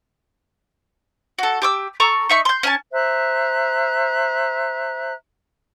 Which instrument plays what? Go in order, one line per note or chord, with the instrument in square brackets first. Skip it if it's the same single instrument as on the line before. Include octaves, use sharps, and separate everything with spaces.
[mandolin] F#4 A4
G4 D6 E6
A4 A#5 C#6 E6
D#4 E5 C#6
C6 G6
C#4 G#5 A5
[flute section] C5 E5 A#5 F#6